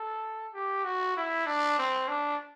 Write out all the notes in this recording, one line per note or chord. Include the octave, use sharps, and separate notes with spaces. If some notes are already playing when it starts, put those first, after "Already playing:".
Already playing: A4
G4
F#4
E4
D4
C4
D4